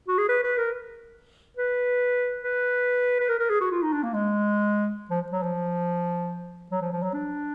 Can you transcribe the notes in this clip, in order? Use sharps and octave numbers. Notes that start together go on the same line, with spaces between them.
F#4
G#4
B4
B4
A#4
B4
B4
B4
A#4
A#4
G#4
F#4
F4
D#4
D4
A#3
G#3
F3
F#3
F3
F#3
F3
F3
F#3
D4